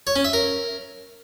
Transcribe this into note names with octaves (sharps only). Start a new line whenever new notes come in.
C#5
C#4
E5
A#4